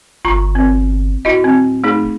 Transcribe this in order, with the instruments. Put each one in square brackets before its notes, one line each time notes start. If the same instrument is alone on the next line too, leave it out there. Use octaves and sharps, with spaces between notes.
[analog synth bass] G1 [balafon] F4 A#5 C#6
[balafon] C4
[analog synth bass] D1 [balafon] E4 F#4 D#5
[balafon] C4
A3 D#4 G#4